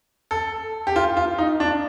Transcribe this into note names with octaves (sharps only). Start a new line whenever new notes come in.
A4
G4
F4
F4
D#4
D4